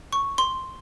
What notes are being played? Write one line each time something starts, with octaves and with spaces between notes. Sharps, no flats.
C#6
C6